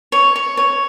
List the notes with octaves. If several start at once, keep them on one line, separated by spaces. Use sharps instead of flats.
C#5
C#5
C#5